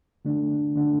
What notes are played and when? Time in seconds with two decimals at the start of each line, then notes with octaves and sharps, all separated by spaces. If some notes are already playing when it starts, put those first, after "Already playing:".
0.25 D3 A3 D4
0.76 D3 A3 D4